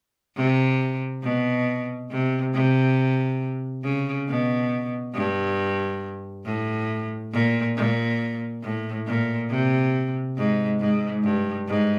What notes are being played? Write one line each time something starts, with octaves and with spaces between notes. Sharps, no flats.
C3
B2
C3
C3
C#3
B2
G2
A2
A#2
A#2
A2
A#2
C3
G#2
G#2
G2
G#2